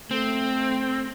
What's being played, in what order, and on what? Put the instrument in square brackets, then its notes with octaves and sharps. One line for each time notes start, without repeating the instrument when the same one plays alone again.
[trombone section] A3 [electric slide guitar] C4